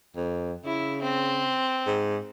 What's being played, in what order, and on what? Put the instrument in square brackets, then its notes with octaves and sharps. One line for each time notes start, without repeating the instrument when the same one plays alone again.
[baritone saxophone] F2
[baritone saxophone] C#3 [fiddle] E4
[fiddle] C4
[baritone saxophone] G#2